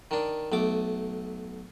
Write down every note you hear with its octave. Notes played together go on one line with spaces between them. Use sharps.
D#3 D4
B1 A3 D6